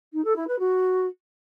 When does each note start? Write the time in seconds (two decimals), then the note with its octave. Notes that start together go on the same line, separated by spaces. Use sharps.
0.13 D#4
0.24 A4
0.36 E4
0.47 B4
0.59 F#4